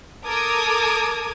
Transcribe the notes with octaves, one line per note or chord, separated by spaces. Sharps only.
A4 A#4 D6 D#6 G#6